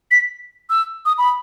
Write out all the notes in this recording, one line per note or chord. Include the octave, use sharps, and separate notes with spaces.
B6
E6
D#6
B5